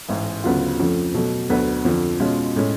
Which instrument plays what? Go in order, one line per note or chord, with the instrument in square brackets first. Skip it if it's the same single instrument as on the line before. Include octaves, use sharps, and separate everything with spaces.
[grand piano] A1 G#2 G#3
D2 C#3 F#3 B3 F4
F2 F3 A3 C#4
B2 F#3 A3
D2 D3 F#3 B3
F2 D3 F3
B2 G#3 C#4 F4
A2 G#3 C#4